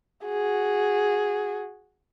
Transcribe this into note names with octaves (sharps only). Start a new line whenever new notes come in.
F#4 G#4